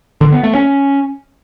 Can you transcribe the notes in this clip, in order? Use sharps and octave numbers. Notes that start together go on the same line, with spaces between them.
D3
B3
A3
C#4